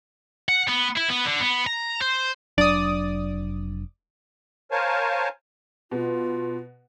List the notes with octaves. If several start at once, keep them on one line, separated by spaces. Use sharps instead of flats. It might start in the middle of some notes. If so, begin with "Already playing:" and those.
F#5
B3
E4
B3
D3
B3
A#5
C5
F1 F#3 D4 D5 D#6
A#4 C5 C#5 F5 G#5 A5
B2 F4